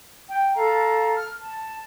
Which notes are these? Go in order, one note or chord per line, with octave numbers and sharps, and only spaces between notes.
G5
A4 F5 A#5
F6
A5